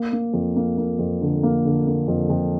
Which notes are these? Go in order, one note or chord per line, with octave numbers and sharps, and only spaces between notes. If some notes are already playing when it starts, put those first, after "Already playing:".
Already playing: A#3
A#3
F2
A#3
A#3
F2
D3
A#3
D3
A#3
F2
F2